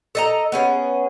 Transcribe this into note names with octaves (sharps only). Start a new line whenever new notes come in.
A4 D#5 A#5
B3 C#4 G#4